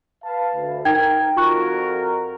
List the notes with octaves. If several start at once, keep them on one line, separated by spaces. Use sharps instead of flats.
B4 F5 A5
D2
D#4 A#4 G5 G#6
F2 F4 F#4 A#4 C#6 F#6